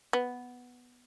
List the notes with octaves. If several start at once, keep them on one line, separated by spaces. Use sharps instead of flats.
B3